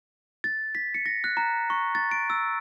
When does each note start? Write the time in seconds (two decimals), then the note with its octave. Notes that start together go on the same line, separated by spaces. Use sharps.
0.44 A6
0.75 B6
0.94 C#7
1.06 A#6
1.24 F#6
1.37 A#5
1.70 C#6
1.95 A6
2.11 D7
2.30 E6